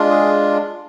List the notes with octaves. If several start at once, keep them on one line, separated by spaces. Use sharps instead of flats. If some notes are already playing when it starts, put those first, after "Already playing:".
Already playing: G#3 D4 F4
G#4